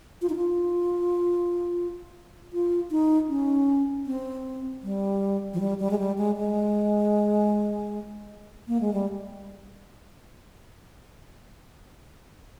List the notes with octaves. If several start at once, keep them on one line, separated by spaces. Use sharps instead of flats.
F4
D#4
F4
F4
D#4
C#4
C4
G3
F3
G3
G3
G#3
G3
G#3
G#3
A#3
G#3
G3